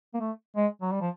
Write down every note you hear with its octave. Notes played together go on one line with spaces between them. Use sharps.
A#3
A3
G#3
F#3
G3
F3